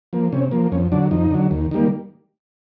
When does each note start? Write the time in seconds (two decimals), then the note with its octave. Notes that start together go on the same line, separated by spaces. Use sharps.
0.13 F3 A#3
0.33 C3 C#4
0.51 F3 A#3
0.72 F2 C#4
0.92 D3 F#3 D4
1.11 F2 D#4
1.31 D3 F#3
1.51 D#2
1.71 D#3 G3 A#3